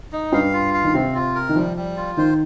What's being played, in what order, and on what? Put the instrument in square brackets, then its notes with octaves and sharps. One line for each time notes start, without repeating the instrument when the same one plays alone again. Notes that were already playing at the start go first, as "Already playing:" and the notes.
[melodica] D#4
[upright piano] G2 [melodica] F5
[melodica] F4
F5
[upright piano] D#3
[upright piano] C3 [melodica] C4
[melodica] F4
A#4
[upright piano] D#3
[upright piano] F3 [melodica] G3
[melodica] G3
F4
[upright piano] D#3 [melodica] C5